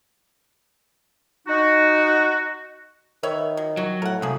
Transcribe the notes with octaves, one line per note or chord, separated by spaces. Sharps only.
D#4 F#4
D#3 B4 C#5 E5
F#3
F#3 F#4
A2 A#4 F#5
C2 A#3 F#4 G#4